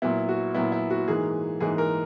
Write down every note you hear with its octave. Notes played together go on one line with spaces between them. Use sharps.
A#2 F#3 B3 E4
F#4
A#2 F#3 B3 E4
E4
F#4
G#2 E3 A#3 G#4
G#2 E3 A#3 G#4
A#4